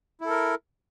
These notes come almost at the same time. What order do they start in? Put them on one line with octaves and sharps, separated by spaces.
E4 A4 A#4